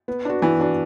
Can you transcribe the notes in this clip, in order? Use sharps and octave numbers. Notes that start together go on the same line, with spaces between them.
B3
D4 F#4
E3 B3
D4 F#4